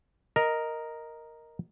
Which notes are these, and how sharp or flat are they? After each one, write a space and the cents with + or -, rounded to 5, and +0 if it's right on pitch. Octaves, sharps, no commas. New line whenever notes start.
A#4 +0 D#5 +0